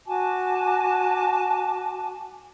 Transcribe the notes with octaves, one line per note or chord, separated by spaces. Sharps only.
F#4 G#5 A5 D6